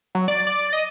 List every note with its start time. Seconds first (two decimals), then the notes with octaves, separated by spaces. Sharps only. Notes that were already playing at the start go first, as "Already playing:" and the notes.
0.15 F#3
0.28 D5
0.47 D5
0.73 D#5